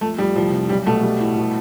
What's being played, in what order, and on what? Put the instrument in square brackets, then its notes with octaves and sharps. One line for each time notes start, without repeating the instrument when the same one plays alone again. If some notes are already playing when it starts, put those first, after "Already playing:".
[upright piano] F2 [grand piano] A3
[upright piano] F2 [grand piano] G3
[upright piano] C2 [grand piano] F3
[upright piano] C3
[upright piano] B1 [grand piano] G3
[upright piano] B2 [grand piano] A3
[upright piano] G3
A2
B2